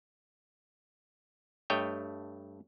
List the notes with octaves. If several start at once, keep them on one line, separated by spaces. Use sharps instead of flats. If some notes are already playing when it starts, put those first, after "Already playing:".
G2 A3 C#5 D#5 G5